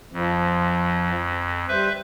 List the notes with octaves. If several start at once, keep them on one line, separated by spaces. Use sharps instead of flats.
F2 F3
G3 B4 C5 E5